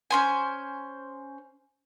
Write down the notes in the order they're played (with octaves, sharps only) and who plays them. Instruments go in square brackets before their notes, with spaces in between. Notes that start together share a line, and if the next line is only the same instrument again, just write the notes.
[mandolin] C#4 C5 G#5